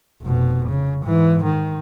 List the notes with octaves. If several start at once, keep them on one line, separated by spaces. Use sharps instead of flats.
F1 B2
C#3
G#2 E3
D#3